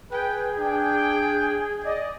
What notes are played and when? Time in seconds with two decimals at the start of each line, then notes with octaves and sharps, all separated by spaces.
0.11 G#4 B4 G5
0.59 D4 G5
1.84 D5 D#5